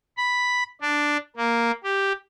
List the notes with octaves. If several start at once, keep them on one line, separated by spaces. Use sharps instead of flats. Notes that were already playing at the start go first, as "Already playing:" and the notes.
B5
D4
A#3
G4